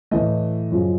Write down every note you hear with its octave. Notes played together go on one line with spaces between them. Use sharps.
A2 E3 A3 D#5
F#2 C#3 F3